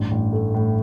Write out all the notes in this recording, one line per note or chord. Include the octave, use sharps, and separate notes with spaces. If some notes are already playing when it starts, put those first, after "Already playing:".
Already playing: A1 G2
A1
A3
A2